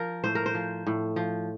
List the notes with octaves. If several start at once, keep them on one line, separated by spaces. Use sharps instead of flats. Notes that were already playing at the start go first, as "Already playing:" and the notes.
Already playing: F3 A#4
A2 C5
A#4
C5
F3
A2
F3